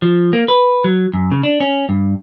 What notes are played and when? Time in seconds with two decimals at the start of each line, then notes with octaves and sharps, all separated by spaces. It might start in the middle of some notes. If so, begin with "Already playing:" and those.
0.02 F3
0.33 A#3
0.48 B4
0.84 F#3
1.14 F#2
1.32 C#3
1.43 D4
1.60 C#4
1.89 G2